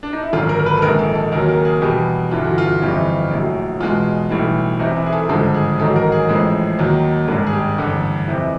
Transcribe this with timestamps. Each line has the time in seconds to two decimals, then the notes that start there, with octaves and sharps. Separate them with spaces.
0.03 D4
0.13 D#4
0.22 E4
0.33 G#1 F#2 D3 F4
0.49 A#4
0.60 A#4
0.66 B4
0.77 A4
0.82 A#1 G#2 D#3 G#3 A#4
0.99 A4
1.15 A4
1.32 D#2 C#3 F#3 A#4
1.48 A#4
1.65 G#4
1.81 E2 B2 G3 G4
2.31 G1 G2 E3 F4
2.44 F#4
2.58 F4
2.81 G1 F2 C3 E3 G3
3.31 A#1 A2 F#3
3.80 E2 B2 G#3 F4
4.30 B1 A2 E3 G3
4.79 C2 C3 E3 D#4
4.96 E4
5.06 G#4
5.13 A4
5.29 G#1 G2 D3 F3 G#3 A4
5.54 G#4
5.79 A1 G#2 D#3 F#3 A4
5.96 A#4
6.12 G#4
6.29 A1 A2 F3 G#3
6.79 D#2 D#3 F#3
7.28 G#1 G2 D#3 G#3
7.47 G#4
7.53 G4
7.78 A1 G2 D3
8.28 F2 C3 E3